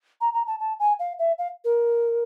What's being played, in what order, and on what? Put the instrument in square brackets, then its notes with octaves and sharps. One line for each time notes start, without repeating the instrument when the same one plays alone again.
[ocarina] A#5
A#5
A5
A5
G#5
F5
E5
F5
A#4